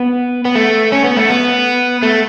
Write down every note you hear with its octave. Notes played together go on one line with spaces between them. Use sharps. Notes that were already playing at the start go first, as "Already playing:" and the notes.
Already playing: B3
B3
A3
C#4
B3
A3
B3
A3